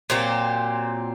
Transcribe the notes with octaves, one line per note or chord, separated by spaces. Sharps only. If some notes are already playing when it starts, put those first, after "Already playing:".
A#2 F#3 C4 G4